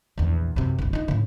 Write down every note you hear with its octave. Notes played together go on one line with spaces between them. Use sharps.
A#1 E2
F#2 C3
G1 C2
D#4 F4
A2 C#3